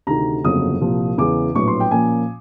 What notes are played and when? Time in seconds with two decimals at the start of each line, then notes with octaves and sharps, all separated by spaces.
0.07 D2 C3 D#3 A#5
0.44 G1 F2 C#3 F#3 A#3 D#6
0.81 C2 A#2 F3
1.18 E2 C#3 E3 G#3 D6
1.55 A#1 A2 F#3 B3 C#6
1.68 C6
1.80 G5
1.91 A#2 F3 A#3 C#4 G#5